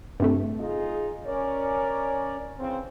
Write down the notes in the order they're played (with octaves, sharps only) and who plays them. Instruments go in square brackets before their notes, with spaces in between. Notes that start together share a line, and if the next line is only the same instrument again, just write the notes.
[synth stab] G2 C3 A3
[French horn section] D#4 F4 G#4
[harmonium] C#4 A#4 D5 [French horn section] C#5
[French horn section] C#3 E3 C4